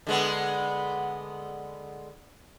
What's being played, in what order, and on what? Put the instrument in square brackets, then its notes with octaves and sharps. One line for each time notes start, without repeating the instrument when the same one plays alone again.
[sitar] D3 G#3 B3